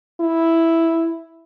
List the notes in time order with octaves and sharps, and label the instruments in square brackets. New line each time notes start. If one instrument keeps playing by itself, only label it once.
[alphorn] E4